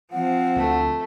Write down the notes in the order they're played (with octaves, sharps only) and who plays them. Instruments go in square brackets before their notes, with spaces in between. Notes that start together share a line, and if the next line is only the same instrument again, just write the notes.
[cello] F3 C4 [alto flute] F#5
[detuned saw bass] D2 [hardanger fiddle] A3